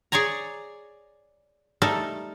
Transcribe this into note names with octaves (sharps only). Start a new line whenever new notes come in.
G#4 C#5 D5 G#5 A#5
G3 A3 D#4 A4 A#4